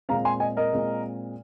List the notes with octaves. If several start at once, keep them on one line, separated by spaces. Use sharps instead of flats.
A#2 G#3 C4 F5 A#5
G#5 C6
D#5 G#5
A#4 D#5
A#2 G#3 C4